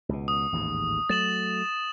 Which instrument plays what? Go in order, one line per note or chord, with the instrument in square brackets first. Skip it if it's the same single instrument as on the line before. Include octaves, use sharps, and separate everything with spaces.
[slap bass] C#2 B2
[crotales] D#6
[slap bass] A1 D#2 G#2
[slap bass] F#3 A3 [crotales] A6 E7 F#7